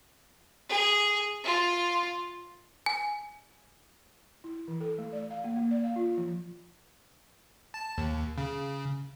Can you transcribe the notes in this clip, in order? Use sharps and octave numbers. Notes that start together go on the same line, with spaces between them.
G#4
F4
G#5
E4
E3
A4
A3
D5
F5
A#3
A#3
D5
F5
F4
F3
A5
D#2
C#3